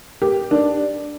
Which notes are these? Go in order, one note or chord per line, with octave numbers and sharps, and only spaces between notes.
G4
D4